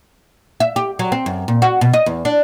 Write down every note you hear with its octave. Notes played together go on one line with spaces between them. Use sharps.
E5
G4
F#3
C4
F#2
A#2
F#4
B2
D#5
E2
D4